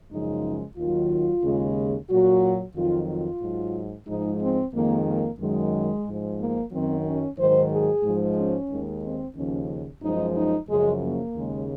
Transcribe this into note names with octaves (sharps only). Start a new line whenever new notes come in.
F#2 C#3 F3 G#3 D#4
D#2 D#3 F#3 F4
D#2 C#3 G#3
A#2 F#3 F#4
F2 D#3 F#3 F4
F4
G#2 F#3
G#2 F3 G#3 D#4
C4
F2 D#3 G#3 A#3
A#3
F#2 D#3 F#3 G#3
G#2 F3 G#3
A#3
F#2 D#3 F#3 C4
C#4
G#2 D#3 F#3 C5
G#4
G#2 F3 G#3
C#4
D#2 D#3 G#3
C4
D#2 C#3 F3 C#4
F#2 F3 G#3 D#4
D#4
F#2 C#3 F3 G#3
A#3
D#2 C#3 G#3